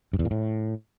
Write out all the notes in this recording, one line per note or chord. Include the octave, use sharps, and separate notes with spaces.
G2
E2
A#2
A2